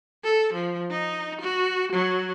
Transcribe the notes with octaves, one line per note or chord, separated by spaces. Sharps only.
A4
F3
D#4
F#4
F#3